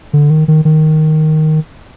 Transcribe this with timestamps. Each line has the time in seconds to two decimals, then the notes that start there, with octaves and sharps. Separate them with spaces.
0.13 D3
0.30 D#3
0.48 D#3
0.65 D#3